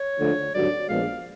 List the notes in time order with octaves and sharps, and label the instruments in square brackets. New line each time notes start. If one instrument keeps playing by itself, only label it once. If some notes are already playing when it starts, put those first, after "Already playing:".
Already playing: [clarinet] C#5
[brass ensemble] D2 D3 F3 A3
[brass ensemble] G#1 G2 D3 F#3 [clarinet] D5
[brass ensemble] A#1 A#2 F3 G#3 B3 [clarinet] F5